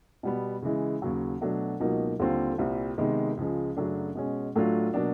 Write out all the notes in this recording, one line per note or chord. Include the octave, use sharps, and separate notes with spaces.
B2 G3 B3
C#3 E3 G#3
D#2 C#3 F#3
B2 F#3 A3 D4
C#2 B2 F#3 A#3 D#4
D#2 D3 G3 C4 F4
C2 A#2 G3 C4
C3 D#3 G#3 B3 D#4
C#2 C#3 F3 G#3
F#2 C#3 F#3 A3 D4
B2 G#3 C#4
A2 F#3 A3 D4 F4
B2 F#3 A#3 D4